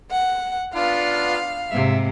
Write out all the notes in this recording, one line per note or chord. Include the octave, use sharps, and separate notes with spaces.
F#5
B3 D4 F4 F5
G#2 C3 E5